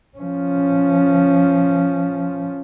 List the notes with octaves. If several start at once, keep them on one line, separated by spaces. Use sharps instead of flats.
F3 C#4